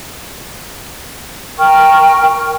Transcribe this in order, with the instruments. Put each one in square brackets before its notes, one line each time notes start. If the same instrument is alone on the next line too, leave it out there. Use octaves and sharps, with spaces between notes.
[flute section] A#4 G5 C#6 F6